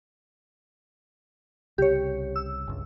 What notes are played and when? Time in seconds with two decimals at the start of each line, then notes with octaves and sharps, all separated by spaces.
1.78 C2 C#3 G4 C#5
2.36 E6
2.68 G1 C#2